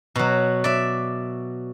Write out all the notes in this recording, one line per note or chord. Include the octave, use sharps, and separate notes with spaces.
B2 F#3
D5 E5